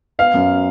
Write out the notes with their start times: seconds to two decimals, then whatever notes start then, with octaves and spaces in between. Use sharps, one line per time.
0.19 B3 F5
0.34 F#2